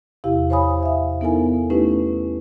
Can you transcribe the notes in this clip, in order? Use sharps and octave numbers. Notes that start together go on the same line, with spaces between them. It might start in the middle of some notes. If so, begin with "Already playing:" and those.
E2 C3 E4 G4 F5
C5 C#5 F5 G#5 B5 D#6
E5 F5
B3 D#4 E4 A4 A#4 G#5
A3 C#4 D#4 E4 G4 B4